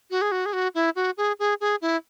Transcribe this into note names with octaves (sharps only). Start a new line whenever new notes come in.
F#4
G#4
F#4
G#4
F#4
E4
F#4
G#4
G#4
G#4
E4